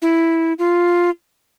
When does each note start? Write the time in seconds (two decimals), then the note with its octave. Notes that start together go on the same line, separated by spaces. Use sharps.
0.02 E4
0.59 F4